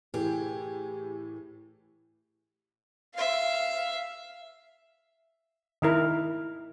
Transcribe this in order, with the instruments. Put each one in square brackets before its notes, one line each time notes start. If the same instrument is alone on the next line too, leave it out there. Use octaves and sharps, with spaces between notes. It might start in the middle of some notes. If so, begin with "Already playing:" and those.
[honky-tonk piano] A2 E3 [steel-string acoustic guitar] G4 G#4
[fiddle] E5 F5
[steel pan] D#3 E4 A#4